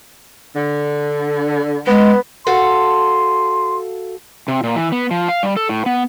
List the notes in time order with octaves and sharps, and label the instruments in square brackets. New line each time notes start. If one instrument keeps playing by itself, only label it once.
[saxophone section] D3
[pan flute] G#3 [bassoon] B3
[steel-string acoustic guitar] F#4 A4 F5 [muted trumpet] C6
[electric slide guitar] C3
A#2
E3
B3
F3
F5
G3
A4
A2
B3